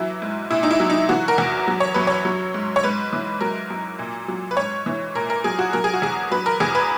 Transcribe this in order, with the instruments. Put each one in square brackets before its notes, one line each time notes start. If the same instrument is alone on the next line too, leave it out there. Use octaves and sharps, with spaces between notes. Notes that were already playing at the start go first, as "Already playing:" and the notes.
Already playing: [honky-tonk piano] E3 F#3 E4
G#2
A#2 E4
D#4
E4
F#3
D#4
E3 F#4
A#4
E2
F#3
C#5
F#2 B4
C#5
F#3
G#2
C#5
G#2 B4
E3
F#3 A#4
F#2
A#2
F#3
B4
G#2 C#5
E3
A#2 A#4
A#4
F#3 G#4
F#4
F#3 A#4
G#4
F#4
E2 G#4
F#3 B4
A#4
E2 G#4
B4